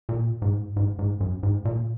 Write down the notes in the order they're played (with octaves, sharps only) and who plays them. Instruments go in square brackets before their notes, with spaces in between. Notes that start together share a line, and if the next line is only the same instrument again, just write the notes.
[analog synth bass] A#2
G#2
G#2
G#2
F#2
G#2
A#2